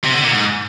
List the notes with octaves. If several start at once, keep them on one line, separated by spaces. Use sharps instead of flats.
C3
D3
A#2
G#2